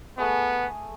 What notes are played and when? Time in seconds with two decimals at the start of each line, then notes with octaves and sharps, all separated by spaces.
0.18 A3 B3 G#4 D#6